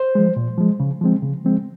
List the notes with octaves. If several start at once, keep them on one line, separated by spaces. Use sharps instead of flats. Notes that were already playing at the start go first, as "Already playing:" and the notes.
Already playing: C5
F3 G#3
A#2
F3 G#3
C#3
F3 G#3 C4
C#3
F3 G#3 C4